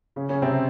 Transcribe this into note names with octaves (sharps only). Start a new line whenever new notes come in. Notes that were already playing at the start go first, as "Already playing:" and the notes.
C#3 C#4
C#3 C#4
C3 C4